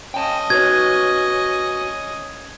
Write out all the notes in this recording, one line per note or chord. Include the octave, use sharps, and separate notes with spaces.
C#4 D#5 G5 A5
F#4 B4 C#5 G#6